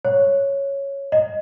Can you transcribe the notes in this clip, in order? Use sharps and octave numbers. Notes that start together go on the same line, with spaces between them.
C#5
D#5